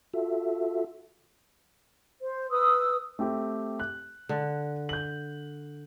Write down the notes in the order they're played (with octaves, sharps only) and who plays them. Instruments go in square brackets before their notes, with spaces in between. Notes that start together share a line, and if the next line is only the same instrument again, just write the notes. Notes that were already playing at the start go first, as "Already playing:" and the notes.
[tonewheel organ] F4 F#4 A4 E5
[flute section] C5
B4 D#6 E6
[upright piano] A3 C4 G4
F#6
[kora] D3
[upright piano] G6 F#7